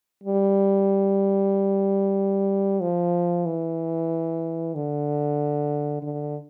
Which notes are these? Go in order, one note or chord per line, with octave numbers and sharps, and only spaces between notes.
G3
F3
E3
D3
D3